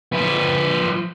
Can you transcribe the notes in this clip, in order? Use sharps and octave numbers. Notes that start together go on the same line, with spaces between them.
F3 B4